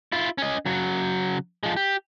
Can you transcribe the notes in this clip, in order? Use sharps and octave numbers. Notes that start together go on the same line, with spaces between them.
E4 F4
C#4 D#5
C#3 F#3
F3 G#3
G4